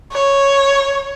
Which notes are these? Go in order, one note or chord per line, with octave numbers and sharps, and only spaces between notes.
C#5